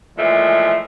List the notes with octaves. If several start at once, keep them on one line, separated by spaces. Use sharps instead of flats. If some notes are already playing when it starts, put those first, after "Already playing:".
A#2 E3 F3 G#3 A3